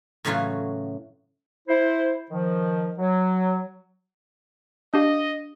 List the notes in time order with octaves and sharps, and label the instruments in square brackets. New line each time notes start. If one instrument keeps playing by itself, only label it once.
[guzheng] A2 C#3 E3 F#3 F4 F#4
[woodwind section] E4 C5
D#3 F3
F#3
[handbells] D4 G4 F5 [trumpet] D#5